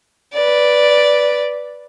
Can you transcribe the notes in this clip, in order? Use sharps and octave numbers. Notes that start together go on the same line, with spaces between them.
B4 D5